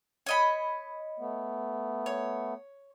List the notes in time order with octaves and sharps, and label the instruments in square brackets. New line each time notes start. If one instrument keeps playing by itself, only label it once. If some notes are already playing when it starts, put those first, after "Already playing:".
[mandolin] C#5 D#5 B5
[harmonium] A3 B3
[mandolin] C#5